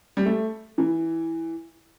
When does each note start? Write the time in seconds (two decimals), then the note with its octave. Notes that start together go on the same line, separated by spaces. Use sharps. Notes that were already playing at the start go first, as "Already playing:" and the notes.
0.17 G3
0.26 A3
0.78 E3